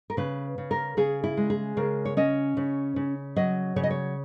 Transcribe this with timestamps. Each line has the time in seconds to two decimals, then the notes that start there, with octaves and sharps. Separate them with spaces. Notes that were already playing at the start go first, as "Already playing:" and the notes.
0.10 A#4
0.17 C#3 B4
0.58 C#3
0.71 A#4
0.97 C#3 G#4
1.24 E4
1.37 G#3
1.50 G#4
1.77 C#3 A#4
2.05 C#5
2.17 C#4 D#5
2.57 C#3
2.96 C#3
3.36 F#3 D#5
3.76 C#3 C#5
3.83 D#5
3.90 C#5